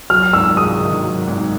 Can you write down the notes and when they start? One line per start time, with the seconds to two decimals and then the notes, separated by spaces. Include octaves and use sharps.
0.10 F#3 F6
0.33 G#1 E6
0.57 G#2 D#6
0.80 D#3
1.03 F#3
1.27 G#1